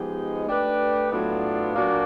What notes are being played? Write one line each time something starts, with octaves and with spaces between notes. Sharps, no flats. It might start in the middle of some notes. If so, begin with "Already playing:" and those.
Already playing: F3 G#3 B3 D#4 G4
A3 D4 G4 B4
A2 F#3 B3 D4 F4
A#2 F#3 A#3 D4 F#4